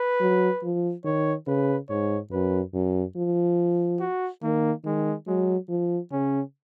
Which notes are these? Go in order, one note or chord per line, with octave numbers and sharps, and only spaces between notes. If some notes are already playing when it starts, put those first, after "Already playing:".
Already playing: B4
F#3
F3
D#3 C#5
C#3 B4
G#2 C#5
F#2 B4
F#2
F3
F#4
D#3 A#3
D#3 G#3
F#3 G#3
F3
C#3 C#4